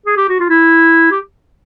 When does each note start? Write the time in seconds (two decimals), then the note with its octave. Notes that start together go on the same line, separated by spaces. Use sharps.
0.06 G#4
0.17 G4
0.29 F#4
0.40 F4
0.50 E4
1.11 G4